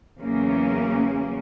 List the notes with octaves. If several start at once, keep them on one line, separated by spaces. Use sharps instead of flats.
E2 C#3 F#3 A#3 C#4